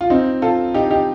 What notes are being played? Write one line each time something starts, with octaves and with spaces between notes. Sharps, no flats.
F4
C4 D#4
F4 A4
D#4 G4
D#4 G4